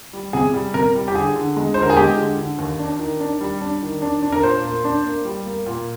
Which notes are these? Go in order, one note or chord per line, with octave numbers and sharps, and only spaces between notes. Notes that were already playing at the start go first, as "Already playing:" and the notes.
G3
C3 G#4
G3
C3 A#4
G3
G4
D3 G#4
D3
G#3
C5
D3
A#4
G#4
G#3 G4
D3
D3
D#2
D4
D#3
D4
G3
D4
D#3
D4
D4
A#4
A#2 C5
A#3
D4
A#3
G3
A#3
A#2